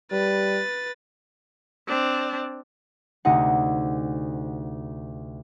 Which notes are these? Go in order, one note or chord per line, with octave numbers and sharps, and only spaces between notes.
G3 B4 A6
C4 D4
D2 C3 D#4 F#5